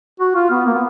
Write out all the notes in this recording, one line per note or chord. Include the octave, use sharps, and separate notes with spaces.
F#4
F4
B3
A#3
B3